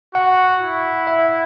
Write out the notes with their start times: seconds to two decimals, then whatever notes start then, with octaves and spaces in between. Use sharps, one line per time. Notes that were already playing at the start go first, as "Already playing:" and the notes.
0.14 F#4 F#5
0.61 E4
1.07 E5